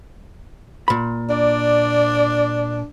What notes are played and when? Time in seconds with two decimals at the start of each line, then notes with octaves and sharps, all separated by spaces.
0.88 A#2 B5
1.30 D4 D5